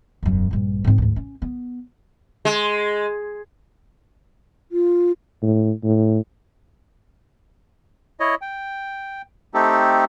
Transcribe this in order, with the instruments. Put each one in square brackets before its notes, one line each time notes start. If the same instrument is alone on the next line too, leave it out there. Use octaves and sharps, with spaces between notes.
[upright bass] E1 F#2
A#1 G2
G#2 C4
D2 G#2
C#4
B3
[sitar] G#3
[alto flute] F4
[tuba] A2
A2
[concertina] E4 C#5 D#5
G5
A3 C4 D#4 G4 A4